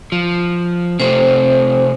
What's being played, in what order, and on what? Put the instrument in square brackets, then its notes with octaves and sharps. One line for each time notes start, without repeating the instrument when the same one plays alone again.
[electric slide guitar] F3
[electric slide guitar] C3 A3 [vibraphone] C4 C5